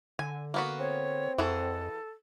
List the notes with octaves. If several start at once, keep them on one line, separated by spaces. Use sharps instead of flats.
D3 G#5
A#3 B3 F#4
C4 C#5
F2 E3 F#4 G#4 A4